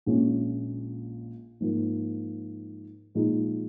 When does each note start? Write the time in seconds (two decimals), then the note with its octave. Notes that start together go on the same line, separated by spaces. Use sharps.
0.06 A#1 A#2 G#3 C#4
1.60 G#2 F3 A#3
3.15 A#2 F3 G#3 D#4